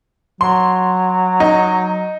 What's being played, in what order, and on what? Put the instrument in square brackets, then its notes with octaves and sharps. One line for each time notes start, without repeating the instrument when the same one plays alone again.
[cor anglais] F#3 [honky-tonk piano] C6
[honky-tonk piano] D#4